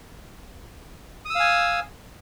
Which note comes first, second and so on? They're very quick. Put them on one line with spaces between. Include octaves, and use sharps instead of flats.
D#6 E6 F5 G#5